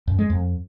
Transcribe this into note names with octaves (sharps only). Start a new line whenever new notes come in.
F#2
G#3
F2